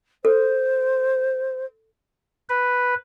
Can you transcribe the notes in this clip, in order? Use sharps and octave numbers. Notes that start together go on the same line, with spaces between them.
A4 C5
B4